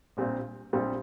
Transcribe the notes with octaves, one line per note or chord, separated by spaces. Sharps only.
A#1 A#2 G3 C4 F4
A#1 A#2 G3 C4 F4